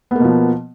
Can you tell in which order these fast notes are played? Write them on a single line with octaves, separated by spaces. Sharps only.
B3 A#3 B2 F3